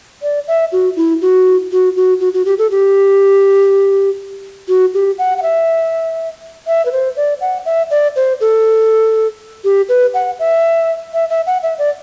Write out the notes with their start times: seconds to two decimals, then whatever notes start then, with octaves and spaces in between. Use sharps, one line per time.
0.22 D5
0.48 E5
0.72 F#4
0.96 E4
1.22 F#4
1.72 F#4
1.97 F#4
2.20 F#4
2.34 F#4
2.45 G4
2.58 A4
2.71 G4
4.68 F#4
4.94 G4
5.19 F#5
5.38 F#5
5.42 E5
6.67 E5
6.86 B4
6.92 C5
7.17 D5
7.41 F#5
7.65 E5
7.91 D5
8.16 C5
8.41 A4
9.64 G4
9.89 B4
10.14 F#5
10.39 E5
11.14 E5
11.30 E5
11.47 F#5
11.63 E5
11.78 D5